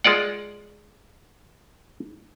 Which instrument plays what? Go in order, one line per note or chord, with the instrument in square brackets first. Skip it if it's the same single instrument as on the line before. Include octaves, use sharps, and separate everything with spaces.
[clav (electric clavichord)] G#3 F4 D5 F#5